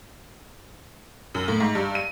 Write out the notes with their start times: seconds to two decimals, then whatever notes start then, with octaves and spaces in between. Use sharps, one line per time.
1.35 F#2
1.48 A2
1.60 G#2
1.75 G2
1.95 D#7